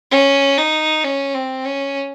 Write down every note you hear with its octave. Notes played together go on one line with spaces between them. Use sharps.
C#4
D#4
C#4
C4
C#4